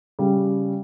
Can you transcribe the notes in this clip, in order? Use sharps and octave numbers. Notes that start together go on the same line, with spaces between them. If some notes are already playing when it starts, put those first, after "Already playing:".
C#3 G3